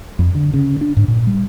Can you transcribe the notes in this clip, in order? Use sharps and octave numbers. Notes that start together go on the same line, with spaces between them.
F2
D3
C#3
D4
G#2
A#2
G3